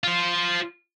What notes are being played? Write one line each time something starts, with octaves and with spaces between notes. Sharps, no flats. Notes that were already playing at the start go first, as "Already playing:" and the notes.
F4 C5